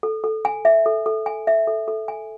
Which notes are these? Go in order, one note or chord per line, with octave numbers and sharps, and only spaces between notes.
A4
A4
G#5
E5
A4
A4
G#5
E5
A4
A4
G#5